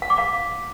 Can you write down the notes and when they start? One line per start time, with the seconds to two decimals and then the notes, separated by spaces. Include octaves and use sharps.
0.02 F#5
0.10 D6
0.18 F5